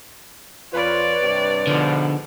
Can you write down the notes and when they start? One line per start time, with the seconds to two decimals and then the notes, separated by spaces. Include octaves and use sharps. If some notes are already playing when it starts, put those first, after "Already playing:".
0.73 F2 F4 B4 C#5 D5
1.21 G2 C3
1.67 G#2 B2 D3 F3